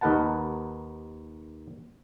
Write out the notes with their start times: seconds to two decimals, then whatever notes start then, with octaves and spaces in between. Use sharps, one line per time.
0.01 D#2 D#4 A#4 B4 F#5 A5